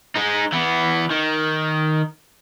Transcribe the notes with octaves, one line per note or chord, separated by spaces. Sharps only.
G#3 D#4
E3 B3
D#3